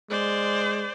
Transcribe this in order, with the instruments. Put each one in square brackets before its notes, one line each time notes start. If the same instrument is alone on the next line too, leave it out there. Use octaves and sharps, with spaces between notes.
[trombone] G#3 [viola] C5 D5